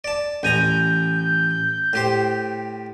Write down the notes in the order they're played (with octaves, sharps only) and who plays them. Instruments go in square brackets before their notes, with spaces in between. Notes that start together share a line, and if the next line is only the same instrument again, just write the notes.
[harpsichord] D5 A5
[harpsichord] A1 G#5 A#5 [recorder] G6
[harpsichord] A2 G4 C5